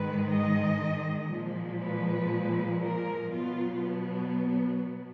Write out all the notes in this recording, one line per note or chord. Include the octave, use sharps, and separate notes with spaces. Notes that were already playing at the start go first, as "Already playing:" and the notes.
Already playing: G#2 D#3 G#3 B4
D#5
A#2 F3 G#3
B4
A#4
B2 F#3 B3 F4